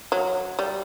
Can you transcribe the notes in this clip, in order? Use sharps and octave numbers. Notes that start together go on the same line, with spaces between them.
F#3
G3